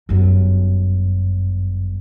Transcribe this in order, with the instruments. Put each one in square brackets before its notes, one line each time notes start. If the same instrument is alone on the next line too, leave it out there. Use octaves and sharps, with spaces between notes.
[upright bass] G1 F#2